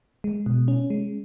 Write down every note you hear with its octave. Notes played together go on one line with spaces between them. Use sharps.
G#3
B2
C#4
G#3